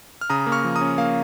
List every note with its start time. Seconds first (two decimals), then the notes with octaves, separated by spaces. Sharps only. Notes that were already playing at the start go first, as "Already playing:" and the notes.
0.21 F6
0.30 C#3 A#5 D#6
0.46 A#3
0.52 C#6 F6
0.64 F3
0.75 A#5 D#6
0.81 C#4
0.98 A#3 F5